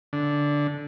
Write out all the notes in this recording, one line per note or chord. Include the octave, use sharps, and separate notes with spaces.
D3